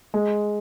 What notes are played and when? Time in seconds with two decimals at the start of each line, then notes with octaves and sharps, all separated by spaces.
0.14 G#3